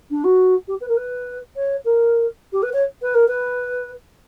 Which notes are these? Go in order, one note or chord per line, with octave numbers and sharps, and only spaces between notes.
D4
F#4
G4
B4
A#4
B4
C#5
A#4
G4
B4
C#5
B4
A#4
B4